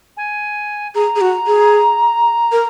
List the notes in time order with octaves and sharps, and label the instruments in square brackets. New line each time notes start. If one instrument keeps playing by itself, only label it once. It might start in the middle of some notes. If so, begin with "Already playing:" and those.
[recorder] G#5
[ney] G#4 [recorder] A#5
[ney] G#4
F#4
G#4
A#4